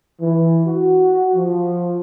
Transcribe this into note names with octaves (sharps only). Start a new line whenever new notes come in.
E3
F#4
F3